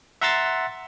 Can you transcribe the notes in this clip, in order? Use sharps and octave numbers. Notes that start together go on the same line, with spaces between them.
E5 F#5 A#5 C6 E6 A6